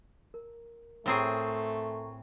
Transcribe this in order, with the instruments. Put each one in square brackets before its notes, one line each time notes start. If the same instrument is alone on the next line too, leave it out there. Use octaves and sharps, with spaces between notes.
[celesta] A#4
[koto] A2 C4 G#4 [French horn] A3 [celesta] A#4 A#5 C#6